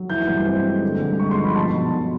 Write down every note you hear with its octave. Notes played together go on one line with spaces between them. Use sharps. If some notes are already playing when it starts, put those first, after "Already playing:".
Already playing: F#3
E3 G6
G2 G6
C4
G#3
D3
G2
G#3 C#6
C6
F3
B5
B2 A5
B1
B1